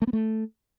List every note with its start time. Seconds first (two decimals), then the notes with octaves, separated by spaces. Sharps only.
0.02 A3
0.07 B3
0.13 A3